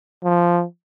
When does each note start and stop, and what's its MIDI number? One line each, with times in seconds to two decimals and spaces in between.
0.24 0.64 53